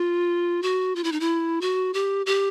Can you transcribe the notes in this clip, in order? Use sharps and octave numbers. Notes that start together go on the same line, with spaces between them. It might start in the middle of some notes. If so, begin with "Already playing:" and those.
Already playing: F4
F#4
F4
E4
D#4
E4
F#4
G4
G4